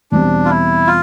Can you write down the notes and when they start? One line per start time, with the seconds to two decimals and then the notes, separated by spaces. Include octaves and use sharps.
0.12 E2 B2 G3 C4 D4
0.45 F4
0.50 E4
0.87 F4